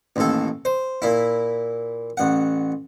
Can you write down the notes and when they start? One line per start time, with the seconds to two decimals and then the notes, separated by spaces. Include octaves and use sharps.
0.16 A1 D#2 A4
0.65 C5
1.02 A#2 E4
2.17 A1 F#5